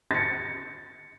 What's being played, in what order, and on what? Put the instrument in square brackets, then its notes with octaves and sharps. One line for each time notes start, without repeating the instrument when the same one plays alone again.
[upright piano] A6 C#7